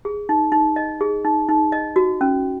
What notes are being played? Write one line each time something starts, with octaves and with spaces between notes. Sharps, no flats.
G#4
D#4
D#4
D#5
G#4
D#4
D#4
D#5
F#4
C#4